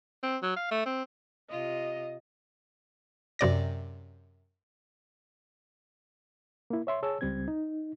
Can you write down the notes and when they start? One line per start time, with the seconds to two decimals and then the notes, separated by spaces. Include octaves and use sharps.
0.23 C4
0.42 F#3
0.56 F5
0.71 A3
0.86 C4
1.50 C3 F4 D#5
3.39 F#2 C3 D5 A#6
6.70 A#3 E4
6.87 C#5 E5 C6
7.03 G#4 C#5 A5 E6
7.21 C#2 G3 C4 G#6
7.48 D#4